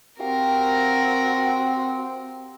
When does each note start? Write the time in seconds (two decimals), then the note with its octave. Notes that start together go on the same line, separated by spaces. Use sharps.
0.20 C4 F#4 G4 A#4 F5 G5